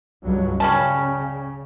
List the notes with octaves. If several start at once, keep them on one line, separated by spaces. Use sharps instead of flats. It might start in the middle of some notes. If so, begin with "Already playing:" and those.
C#2 G2 F#3
C#3 G3 C#4 A5